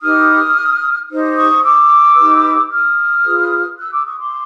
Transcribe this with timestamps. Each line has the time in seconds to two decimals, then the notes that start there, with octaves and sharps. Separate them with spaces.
0.01 D#4 G4 B4 D#6 F6
1.09 D#4 G4 C5
1.36 C#6 D#6
1.63 D6 E6
2.16 D#4 G4 B4
2.70 D#6 F6
3.24 F4 G#4 B4
3.78 E6 F#6
3.91 D6 E6
4.05 C#6 D#6
4.18 C6 D6